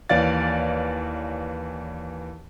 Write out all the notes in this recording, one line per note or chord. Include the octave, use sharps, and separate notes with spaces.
D#2 E3 C#5 D5 F5 A6